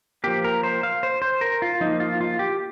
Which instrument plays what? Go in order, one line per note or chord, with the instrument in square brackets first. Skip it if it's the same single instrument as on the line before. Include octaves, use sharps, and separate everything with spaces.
[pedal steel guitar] F3 A#3 G4
A#4
C5
F5
C5
C5
A#4
F4
F3 A#3 D#4
F4
F4
G4